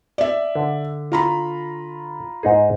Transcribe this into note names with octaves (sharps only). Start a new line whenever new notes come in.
D5 E5
D3
F4 A#5 B5
G#2 D#4 G#4